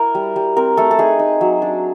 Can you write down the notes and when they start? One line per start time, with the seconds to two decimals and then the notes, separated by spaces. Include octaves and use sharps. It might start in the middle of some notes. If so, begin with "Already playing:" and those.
Already playing: E4 A#4
0.15 G3
0.36 G3
0.57 C4 A#4
0.77 A3 A4
0.91 A4
0.98 D#4 G#4
1.19 D#4
1.41 F#3
1.62 D4